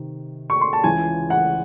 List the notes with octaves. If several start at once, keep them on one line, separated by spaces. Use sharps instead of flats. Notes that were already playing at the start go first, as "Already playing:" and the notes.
Already playing: C3 D#3
C#6
C6
A5
C#2 C#3 E3 G#5
F#5